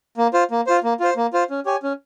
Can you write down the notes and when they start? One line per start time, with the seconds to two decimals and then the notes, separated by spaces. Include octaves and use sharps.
0.17 A#3
0.34 F4 C5
0.51 A#3
0.67 F4 C5
0.84 A#3
1.00 F4 C5
1.17 A#3
1.33 F4 C5
1.50 C#4
1.66 G4 C#5 G#5
1.83 C#4